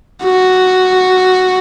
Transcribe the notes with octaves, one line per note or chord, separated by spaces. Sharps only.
F#4